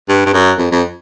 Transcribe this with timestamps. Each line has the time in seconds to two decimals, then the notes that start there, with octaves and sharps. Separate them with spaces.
0.09 G2
0.26 G2
0.34 F#2
0.58 F2
0.72 F2